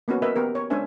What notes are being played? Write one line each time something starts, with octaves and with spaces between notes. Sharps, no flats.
A#3 B3 C#4 F#4 B4
A#4 B4 D#5 E5
B3 G4 A#4
C#5
G#3 C#4 D4 C5 E5 G#5